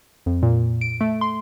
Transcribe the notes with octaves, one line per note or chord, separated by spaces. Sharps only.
F2
A#2
D7
A3
C6